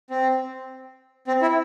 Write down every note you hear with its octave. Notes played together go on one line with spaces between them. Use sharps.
C4
C4
E4